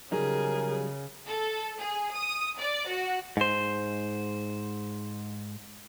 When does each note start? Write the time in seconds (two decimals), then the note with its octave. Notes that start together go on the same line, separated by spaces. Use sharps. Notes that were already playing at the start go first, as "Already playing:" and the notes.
0.12 C#3 F#3 G3 D#4 G#4 A#4
1.27 A4
1.80 G#4
2.14 D#6
2.60 D5
2.89 F#4
3.37 G#2 C5